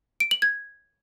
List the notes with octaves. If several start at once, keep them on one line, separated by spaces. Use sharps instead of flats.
D7
F#7
G#6